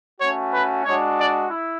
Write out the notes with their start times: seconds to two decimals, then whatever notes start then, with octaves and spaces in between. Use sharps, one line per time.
0.20 A3 C#4 F#4 C#5
0.53 B4
0.84 G#3 D4 F#4 C#5
1.17 D5
1.49 E4